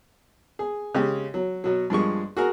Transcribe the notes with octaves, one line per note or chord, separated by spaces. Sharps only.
G#4
C#3 G#3 G4
F#3
B2 F#3
G2 F3 G#3 C#6
F#4 G#4 A#4